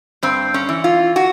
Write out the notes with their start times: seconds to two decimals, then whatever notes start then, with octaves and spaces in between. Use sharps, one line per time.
0.23 G2 C4
0.54 C#4
0.69 E3
0.84 F4
1.16 F#4